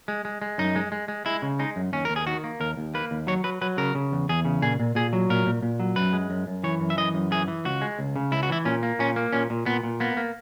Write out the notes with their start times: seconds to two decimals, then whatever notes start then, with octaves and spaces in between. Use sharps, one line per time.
0.08 G#3
0.25 G#3
0.42 G#3
0.58 F#2 D#4
0.76 G#3
0.92 G#3
1.08 G#3
1.26 G#3 E4
1.42 C#3
1.59 G#3 D#4
1.76 F#2
1.93 D#2 C#4
2.05 D#2 A#4
2.16 G#4
2.26 D#3 F#4
2.44 A#3
2.60 D#2 A#4
2.77 D#2
2.94 A#3 B4
3.11 D#2
3.27 F#3 C#5
3.44 F#3 B4
3.61 F#3 B4
3.78 C#3 A#4
3.95 C#3
4.12 E2
4.29 E2 G#4
4.45 C#3
4.62 A#2 G#4
4.80 A#2
4.95 A#2 G#4
5.13 F#3
5.30 A#2 A#4
5.46 A#2
5.62 A#2
5.80 F#3
5.96 F#2 B4
6.13 G#3
6.30 F#2
6.47 F#2
6.64 E3 C#5
6.80 F#2
6.90 E5
6.97 E3 D#5
7.14 F#2
7.31 E3 G#4
7.48 E3
7.65 C#2 F#4
7.81 G#3
7.99 C#2
8.16 C#3
8.32 C#2 E4
8.43 F#4
8.50 E3 E4
8.65 A#2 C#4
8.83 A#3
8.99 A#2 C#4
9.16 A#3
9.33 A#2 C#4
9.50 A#2
9.66 A#2 B3
9.83 A#2
10.00 A#3 B3
10.17 A#3